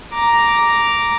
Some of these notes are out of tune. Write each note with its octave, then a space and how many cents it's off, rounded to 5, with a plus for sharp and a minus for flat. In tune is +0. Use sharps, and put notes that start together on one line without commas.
A#5 +0 D6 -5